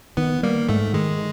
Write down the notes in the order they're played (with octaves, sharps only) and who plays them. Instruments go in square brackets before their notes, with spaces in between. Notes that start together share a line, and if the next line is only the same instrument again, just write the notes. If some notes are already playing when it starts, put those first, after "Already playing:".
[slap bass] D#3 [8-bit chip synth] B3
[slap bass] G3 [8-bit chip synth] A#3
[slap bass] G#2 [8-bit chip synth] A3
[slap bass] D#3 [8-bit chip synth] G#3